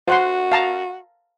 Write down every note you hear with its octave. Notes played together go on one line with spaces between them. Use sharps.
F#4 C5 F#5 C6
F5 A5 A#5